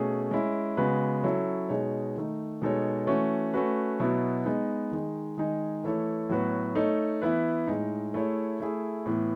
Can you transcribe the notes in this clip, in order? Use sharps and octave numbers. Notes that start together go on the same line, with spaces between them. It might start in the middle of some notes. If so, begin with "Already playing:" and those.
Already playing: B2 A3 C#4 G#4
G#3 C#4 E4
C#3 G#3 B3 F#4 B4
F#3 C#4 E4 A4
B2 G#3 D#4 G#4 C#5
D#3 A3 D#4
B2 G#3 D#4 A4 C#5
E3 A3 C#4 F#4
A3 C#4 F#4 B4
B2 F#3 B3 E4
G#3 B3 D#4
D#3 G#3 D#4
D#3 G#3 D#4 G#4
E3 A3 E4 A4 C#5
A2 F#3 B3 F#4 B4
A3 D#4 A4 C#5
E3 B3 E4 B4
A2 G#3 D#4
A3 E4 G#4 C#5
A3 E4 G#4
A2 E3 B3